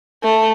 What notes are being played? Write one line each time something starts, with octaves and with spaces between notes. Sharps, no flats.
A3